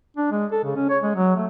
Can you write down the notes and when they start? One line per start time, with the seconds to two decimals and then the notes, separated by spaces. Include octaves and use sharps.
0.17 D4
0.31 G#3
0.52 A4
0.64 C#3
0.76 C#4
0.89 C#5
1.03 G#3
1.15 F#3
1.36 A3